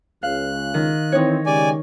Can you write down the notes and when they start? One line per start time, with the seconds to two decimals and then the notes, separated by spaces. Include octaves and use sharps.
0.23 C#2 C#3 F5 F#6
0.74 D#3
1.12 E3 C4 D#4 C#5
1.46 C#3 G#3 G4 D5 G#5